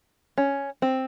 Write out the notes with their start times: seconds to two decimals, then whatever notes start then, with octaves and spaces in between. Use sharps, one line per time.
0.38 C#4
0.82 C4